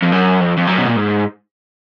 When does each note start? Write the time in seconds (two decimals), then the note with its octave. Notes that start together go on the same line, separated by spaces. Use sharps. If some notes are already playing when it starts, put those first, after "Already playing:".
0.02 F2
0.12 F#2
0.40 F2
0.57 F2
0.67 F#2
0.78 B2
0.87 A#2
0.96 G#2